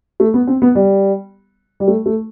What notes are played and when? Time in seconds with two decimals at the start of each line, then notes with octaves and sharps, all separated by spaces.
0.20 A3
0.34 B3
0.47 C4
0.62 B3
0.75 G3
1.80 G3
1.88 A3
2.06 A3